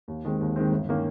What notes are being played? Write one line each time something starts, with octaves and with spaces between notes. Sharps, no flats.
D#2
D#3 G#3 C4
D#2
D#3 G#3 C4
G1
D#3 A#3 C#4